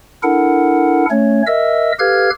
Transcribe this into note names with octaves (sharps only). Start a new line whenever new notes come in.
D4 E4 A4 A#4 F#5
A3 C#4 C#5
A#4 D#5 E5 E6
G4 A4 B4 F5 F6 G#6